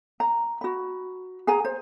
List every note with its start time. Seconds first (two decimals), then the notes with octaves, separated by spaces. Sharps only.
0.20 A#5
0.61 F#4 B5
1.47 G#4 F#5 G#5 A#5
1.65 C5